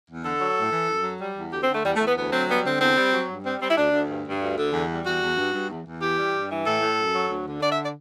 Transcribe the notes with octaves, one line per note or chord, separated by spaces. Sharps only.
E2
D3 A4
F#3
A2
E3
F#2
F#3
G3
E2
D2 G4
C4
D3
A3
E2 G3
A3
E2
B3
D2 B3
F#3 C4
G3 B3
D3 C4
E2 C4
G3
F#3
G2
G3 C4
G3 C4
E4
D2 D4
D2
G2
G2
D2
D3
E2
G3
E2 F#4
E2
G2
G2
E2
E2
E3 G4
G3
G2
E3
A2 A4
A2
F#2
F#3
D2
D3
D3 D5
E5
D5